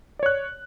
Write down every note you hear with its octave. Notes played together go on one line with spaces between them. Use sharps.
C#5 D5 F#6